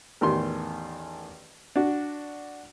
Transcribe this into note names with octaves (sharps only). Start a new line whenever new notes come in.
A1 E2 D#3 C6
D4 F#4